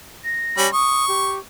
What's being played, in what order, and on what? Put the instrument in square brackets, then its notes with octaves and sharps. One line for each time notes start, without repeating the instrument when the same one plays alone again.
[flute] A#6
[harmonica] G3 C#4 B5
[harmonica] C#6 [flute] D#6
[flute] G4